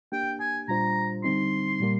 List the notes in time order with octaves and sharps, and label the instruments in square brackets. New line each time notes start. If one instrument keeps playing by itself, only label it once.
[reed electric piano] A#3 D4 G4 [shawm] G5
[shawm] G#5
[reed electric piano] A#2 G3 D4 F4 C5 [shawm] A#5
[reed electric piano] D3 G3 C4 D#4 [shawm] C6
[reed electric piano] A#2 G3 A#3